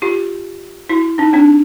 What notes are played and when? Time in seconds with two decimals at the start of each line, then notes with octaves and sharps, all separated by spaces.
0.02 F4 G4
0.89 E4 F#4
1.18 C#4 D#4
1.33 C4 D4